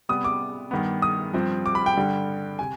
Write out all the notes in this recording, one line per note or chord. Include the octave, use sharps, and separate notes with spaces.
C3 G3 B3 D#6
D6
G2 D#3 B3
D#6
G2 F3 C4
D6
B5
G5
G2 D3 G3
C3 G#5